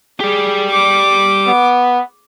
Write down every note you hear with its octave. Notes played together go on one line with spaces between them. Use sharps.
G4 G#4 D5
D6
B3